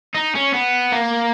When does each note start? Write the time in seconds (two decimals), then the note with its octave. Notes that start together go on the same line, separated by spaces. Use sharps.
0.15 D#4
0.35 C#4
0.54 B3
0.92 A#3